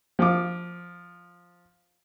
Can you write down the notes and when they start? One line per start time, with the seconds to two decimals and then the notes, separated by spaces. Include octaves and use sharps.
0.19 F3 D6